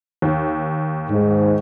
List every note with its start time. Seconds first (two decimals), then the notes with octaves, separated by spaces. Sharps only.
0.22 D#2
1.10 G#2